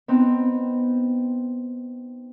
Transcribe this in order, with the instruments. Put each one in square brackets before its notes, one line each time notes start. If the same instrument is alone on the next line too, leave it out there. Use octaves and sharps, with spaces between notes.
[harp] B3 C4 D#4